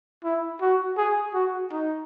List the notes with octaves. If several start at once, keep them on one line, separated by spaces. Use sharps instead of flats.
E4
F#4
G#4
F#4
D#4